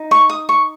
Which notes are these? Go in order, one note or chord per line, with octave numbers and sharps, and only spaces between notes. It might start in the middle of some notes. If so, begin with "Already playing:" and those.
Already playing: D#4
C#6
D#6
C#6